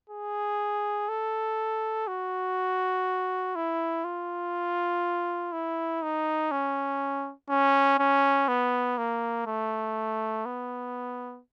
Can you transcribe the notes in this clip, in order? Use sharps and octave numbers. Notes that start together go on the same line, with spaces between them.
G#4
A4
F#4
E4
F4
E4
D#4
C#4
C#4
C#4
B3
A#3
A3
B3